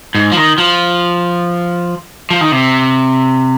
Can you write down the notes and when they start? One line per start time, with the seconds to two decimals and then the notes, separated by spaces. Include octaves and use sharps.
0.15 G#2
0.32 F3
0.37 D#3
0.58 F3
2.30 F3
2.41 D#3
2.52 C3